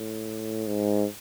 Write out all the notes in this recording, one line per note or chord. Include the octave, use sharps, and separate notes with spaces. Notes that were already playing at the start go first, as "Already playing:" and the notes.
Already playing: A2
G#2